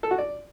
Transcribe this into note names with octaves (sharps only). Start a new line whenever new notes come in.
A4
F#4
D5